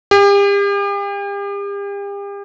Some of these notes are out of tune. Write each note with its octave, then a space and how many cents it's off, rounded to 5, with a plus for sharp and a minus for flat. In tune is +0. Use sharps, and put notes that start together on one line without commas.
G4 +40